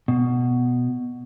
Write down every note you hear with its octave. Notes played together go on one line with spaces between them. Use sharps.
B2